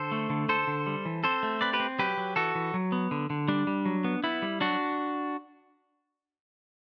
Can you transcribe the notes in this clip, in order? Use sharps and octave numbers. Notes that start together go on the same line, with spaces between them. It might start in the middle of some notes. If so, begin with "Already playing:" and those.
Already playing: D3 A4 C5
A3
D3
D3 A4 C5
D3
G3
E3
C4 A4 C5
A3
C4 B4 D5
G4 B4
C4
F#3 G4 B4
F#3
E3 F#4 A4
E3
F#3
B3
D3
D3
G3 D4
G3
F#3
B3
B3 E4
G3
F#3 D4 F#4